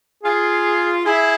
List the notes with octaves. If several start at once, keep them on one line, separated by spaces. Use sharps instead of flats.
F4 G#4
E4 G#4